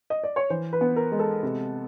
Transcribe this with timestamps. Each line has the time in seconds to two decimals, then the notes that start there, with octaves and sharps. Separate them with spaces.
0.10 D#5
0.24 D5
0.36 C#5
0.50 E3 C5
0.73 B4
0.81 B3
0.96 A#4
1.12 G#3
1.19 A4
1.43 C3